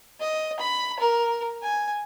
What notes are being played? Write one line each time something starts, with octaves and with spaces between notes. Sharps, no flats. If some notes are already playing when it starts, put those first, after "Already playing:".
D#5
B5
A#4
G#5